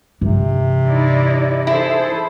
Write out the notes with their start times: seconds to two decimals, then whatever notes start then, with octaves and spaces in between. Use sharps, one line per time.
0.21 G2 C3 E3
0.86 D#4 E4 D5
1.67 E4 G#4 A4 C5